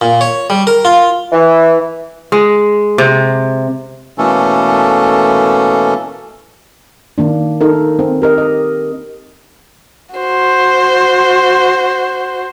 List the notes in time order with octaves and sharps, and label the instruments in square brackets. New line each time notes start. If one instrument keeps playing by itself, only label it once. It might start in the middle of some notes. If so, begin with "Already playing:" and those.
[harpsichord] A#2
C#5
G3
A#4
F4
[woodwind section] E3
[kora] G#3
C3
[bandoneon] B2 E3 A3 A#3 C#4 A4
[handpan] D#3 A#3 D4
D#4 A4 A#4
C4
G4 A#4 D#5
D#5
[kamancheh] F#4 C5